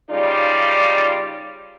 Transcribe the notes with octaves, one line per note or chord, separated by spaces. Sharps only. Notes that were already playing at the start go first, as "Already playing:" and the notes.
C#3 G3 D#4 F4 D5